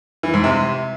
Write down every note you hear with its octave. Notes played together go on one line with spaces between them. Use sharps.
E3
G#2
C3